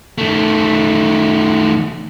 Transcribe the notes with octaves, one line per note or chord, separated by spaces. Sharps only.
D#3 A3